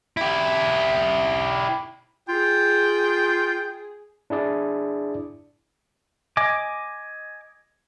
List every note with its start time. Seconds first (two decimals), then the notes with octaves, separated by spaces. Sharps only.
0.17 E4 G4
2.29 F4 G#4 G5
4.30 D4 E4 G#4 D5
6.37 D#5 G#5 D6